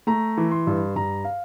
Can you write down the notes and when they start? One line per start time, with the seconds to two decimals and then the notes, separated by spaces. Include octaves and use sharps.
0.07 A3 A#5
0.37 E3
0.51 C6
0.67 G2
0.96 G2 A#5
1.25 F5